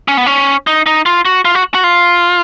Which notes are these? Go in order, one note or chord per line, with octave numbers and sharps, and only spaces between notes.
C#4
B3
C#4
D#4
D#4
F4
F#4
F4
F#4
F#4
F4